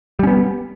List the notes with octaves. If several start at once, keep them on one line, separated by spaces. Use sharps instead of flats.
G3 B3 C#4